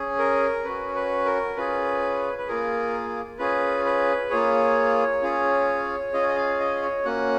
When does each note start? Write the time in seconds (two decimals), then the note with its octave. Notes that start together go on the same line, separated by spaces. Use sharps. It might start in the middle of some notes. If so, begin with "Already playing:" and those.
Already playing: C#4 G#4
0.19 A#4
0.64 C#4 F#4 B4
0.95 B4
1.25 A#4
1.56 C#4 F4 G#4 B4
2.38 B4
2.48 A#3 F4 G#4 A#4
3.39 C#4 F4 G#4 B4
3.85 B4
4.30 A#3 F4 G#4 C#5
5.22 C#4 F4 G#4
6.13 C#4 F4 G#4 D#5
6.28 D#5
6.36 F5
6.60 D#5
6.82 C#5
7.05 A#3 C#4 F#4 F#5